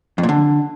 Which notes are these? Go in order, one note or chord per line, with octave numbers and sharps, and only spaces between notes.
F2
A#2
D3